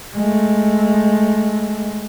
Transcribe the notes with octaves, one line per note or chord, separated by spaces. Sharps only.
G#3 A3